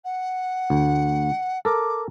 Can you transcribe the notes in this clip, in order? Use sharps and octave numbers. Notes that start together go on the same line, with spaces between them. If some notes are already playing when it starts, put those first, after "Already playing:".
F#5
D2
A4 A#4 D6